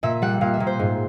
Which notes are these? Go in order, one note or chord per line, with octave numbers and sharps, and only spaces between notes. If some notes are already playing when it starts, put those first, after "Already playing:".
A#2 E5
G3 F#5
A#2 F5
E5
A#2
C5
G#2